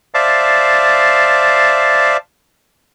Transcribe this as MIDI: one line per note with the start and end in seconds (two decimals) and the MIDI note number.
0.14 2.17 72
0.14 2.17 74
0.14 2.17 76
0.14 2.17 77
0.14 2.17 81